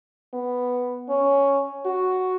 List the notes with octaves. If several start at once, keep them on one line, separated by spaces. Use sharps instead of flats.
B3
C#4
F#4